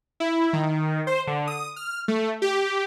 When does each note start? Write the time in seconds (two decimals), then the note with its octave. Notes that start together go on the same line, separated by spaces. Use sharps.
0.20 E4
0.53 D#3
1.07 C5
1.27 D3
1.47 D#6
1.76 F6
2.08 A3
2.42 G4